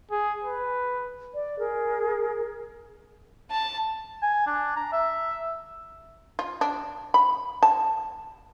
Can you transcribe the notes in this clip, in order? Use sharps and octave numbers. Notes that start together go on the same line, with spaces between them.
G#4
B4
D5
G#4 A#4
A5
G#5
D4
A#5
E5
F4
D4
B5
A5